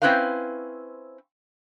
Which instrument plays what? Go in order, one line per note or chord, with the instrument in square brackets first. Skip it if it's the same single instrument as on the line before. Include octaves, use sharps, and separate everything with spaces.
[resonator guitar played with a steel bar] C4 C#4 E4 B4 C5 F5